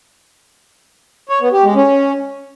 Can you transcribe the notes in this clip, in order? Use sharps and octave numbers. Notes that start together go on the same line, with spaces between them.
C#5
B3
G4
G#3
C#4